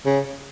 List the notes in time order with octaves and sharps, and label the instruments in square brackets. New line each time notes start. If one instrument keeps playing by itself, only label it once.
[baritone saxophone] C#3